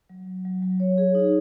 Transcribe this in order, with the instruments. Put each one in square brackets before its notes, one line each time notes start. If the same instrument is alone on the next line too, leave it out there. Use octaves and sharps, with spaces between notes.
[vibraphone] F#3
F#3
F#3
F#3
C#5
G#4
D#4